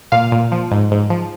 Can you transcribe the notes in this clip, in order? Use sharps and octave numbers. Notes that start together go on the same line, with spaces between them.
A#2 F5
A#2
F3
G#2
G#2
F3